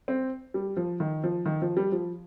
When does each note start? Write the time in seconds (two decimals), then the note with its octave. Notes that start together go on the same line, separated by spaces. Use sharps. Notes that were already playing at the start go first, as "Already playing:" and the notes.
0.08 C4
0.54 G3
0.77 F3
1.00 D#3
1.24 F3
1.46 D#3
1.62 F3
1.77 G3
1.92 F3